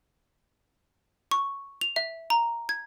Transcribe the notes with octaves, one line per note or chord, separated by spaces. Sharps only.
C#6
F7
E5
A#5
G#6